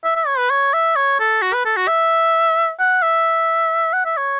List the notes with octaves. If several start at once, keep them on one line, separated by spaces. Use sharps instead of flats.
E5
E5
C#5
B4
C#5
E5
C#5
A4
F#4
B4
A4
F#4
E5
F#5
E5
F#5
E5
C#5